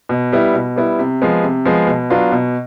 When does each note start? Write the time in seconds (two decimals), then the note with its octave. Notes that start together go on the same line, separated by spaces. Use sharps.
0.09 B2
0.32 G3 B3 E4
0.54 B2
0.76 G3 B3 E4
0.99 C3
1.22 F3 G#3 B3
1.43 C3
1.65 F3 G#3 B3
1.87 B2
2.10 F#3 B3 D4 F4
2.32 B2